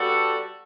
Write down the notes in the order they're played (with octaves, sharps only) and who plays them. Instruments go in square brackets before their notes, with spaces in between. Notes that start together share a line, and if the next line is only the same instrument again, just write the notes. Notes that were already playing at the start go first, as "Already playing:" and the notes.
Already playing: [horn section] G3 B3 F#4 A4